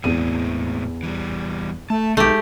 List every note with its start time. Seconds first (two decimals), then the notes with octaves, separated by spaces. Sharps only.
0.04 E2 A2 G#3 C4 D#7
1.03 E3 G3
1.90 A3 A5
2.17 B1 G#3 A3 D#4 G4